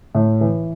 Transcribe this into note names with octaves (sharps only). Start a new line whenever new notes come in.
A2
E3